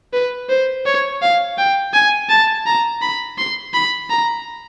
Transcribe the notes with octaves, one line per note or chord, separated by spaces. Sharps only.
B4
C5
C#5
F5
G5
G#5
A5
A#5
B5
C6
B5
A#5